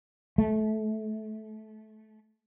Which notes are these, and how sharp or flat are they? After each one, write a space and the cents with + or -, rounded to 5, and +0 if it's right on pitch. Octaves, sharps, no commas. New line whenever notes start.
A3 -25